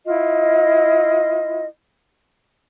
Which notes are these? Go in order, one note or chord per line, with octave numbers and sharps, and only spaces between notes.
E4 F4 D#5